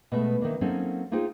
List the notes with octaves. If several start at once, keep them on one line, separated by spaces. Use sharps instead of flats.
B2 G#3 A3 B4
D#3 E3 A#3 D4
F#3 A#3 C4 C#4 D#4 A4
A#3 D#4 F4 G#4 C5 G5